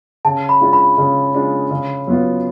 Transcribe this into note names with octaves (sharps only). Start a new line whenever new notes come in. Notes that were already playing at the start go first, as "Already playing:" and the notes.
C#3 A5
B5
G#3 D4 F4
B5
C#3
G#3 D4 F4
C#3
F#3 B3 F4